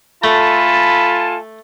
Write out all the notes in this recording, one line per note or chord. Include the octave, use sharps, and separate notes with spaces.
A3 F4 A4 G#5 A5 B5